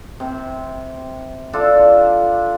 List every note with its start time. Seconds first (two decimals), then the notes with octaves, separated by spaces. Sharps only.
0.20 C3
1.53 D4 F4 A4